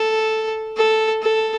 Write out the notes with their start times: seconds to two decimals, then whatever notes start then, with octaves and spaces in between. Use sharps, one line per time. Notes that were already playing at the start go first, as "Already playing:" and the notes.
Already playing: A4
0.77 A4
1.22 A4